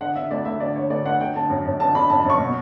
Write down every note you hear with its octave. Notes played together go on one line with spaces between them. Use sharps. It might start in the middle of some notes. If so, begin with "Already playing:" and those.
D3 F#5
D3 E5
D2 D5
D2 E5
D3 D5
D3 C#5
D2 D5
D2 F#5
D3 G5
D3 A5
F#2
F#2
D3 A5
D3 B5
F#2 A5
A5
F#2
C#6
B2